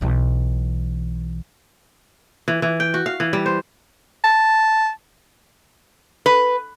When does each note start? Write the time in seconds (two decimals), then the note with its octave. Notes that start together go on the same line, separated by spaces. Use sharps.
0.01 B1 E3
2.48 E3
2.62 E3
2.80 G5
2.94 F#4
3.06 F5
3.20 E3
3.33 G3
3.46 C5
4.24 A5
6.26 B4